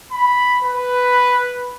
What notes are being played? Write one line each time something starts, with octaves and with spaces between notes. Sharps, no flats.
B5
B4